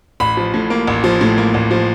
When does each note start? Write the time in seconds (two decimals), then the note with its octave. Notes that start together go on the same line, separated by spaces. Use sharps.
0.20 A1 B5
0.37 F3
0.54 A2
0.70 A#3
0.87 A1
1.04 F3
1.21 A2
1.38 A#3
1.54 A1
1.71 F3